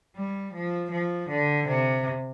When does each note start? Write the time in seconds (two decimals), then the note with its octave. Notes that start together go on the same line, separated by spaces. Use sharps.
0.16 G3
0.54 F3
0.91 F3
1.30 D3
1.67 C3